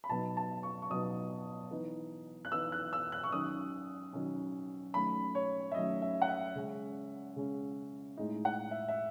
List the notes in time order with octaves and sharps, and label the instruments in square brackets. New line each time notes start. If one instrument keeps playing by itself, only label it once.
[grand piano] B5
B2 F#3 B3 D#4 A5
A5
C#6
C#6
B2 F#3 B3 D#4 D#6
E3 B3 D#4
F#6
E3 B3 D#4 E6
F#6
E6
F#6
C#6
D#3 F#3 C#4 D#6
D#3 F#3 C#4
D#3 F#3 A3 C#4 B5
C#5
E5
D#3 F#3 A3 C#4 D#5
E5
F#5
E5
C#3 G#3 C#4
C#3 G#3 C#4
A2 G#3 D#4
F#5
E5
E5